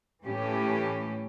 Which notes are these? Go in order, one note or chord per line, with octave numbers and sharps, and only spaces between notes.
A2 E3 A3 C#4 G4